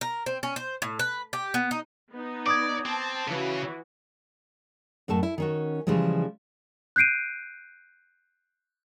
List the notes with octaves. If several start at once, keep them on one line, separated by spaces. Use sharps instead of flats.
A#4
C4
C#4
C5
A2
B4
G4
B3
D#4
B3 D#4
D5 D6 D#6 G#6
C4 A5
C#3 E3 F#4
F#2 A2 A3 A5
E4
D#3 C#4 F#4
C#3 E3 F3 G3 G#3
F#6 G6 C7 D7 D#7